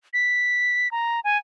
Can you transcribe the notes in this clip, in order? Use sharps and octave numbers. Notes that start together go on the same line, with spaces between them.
B6
A#5
G#5